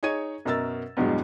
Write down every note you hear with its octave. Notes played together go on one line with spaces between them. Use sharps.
D#4 G#4 C#5 C#6 G#6 D#7
F#2 B2 A#4 E6 A6
E2 G2 B2 F#3 G#3